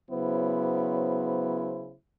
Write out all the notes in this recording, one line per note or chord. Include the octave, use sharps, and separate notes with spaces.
C#3 F#3 B3 E4 C5